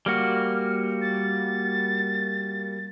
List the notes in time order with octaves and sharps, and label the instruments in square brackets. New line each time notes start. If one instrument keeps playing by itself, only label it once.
[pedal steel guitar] G3 A#3 F#4 [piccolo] F6
[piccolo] A6